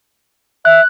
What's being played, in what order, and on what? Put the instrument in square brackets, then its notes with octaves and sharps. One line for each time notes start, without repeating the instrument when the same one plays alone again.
[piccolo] E5 [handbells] F#6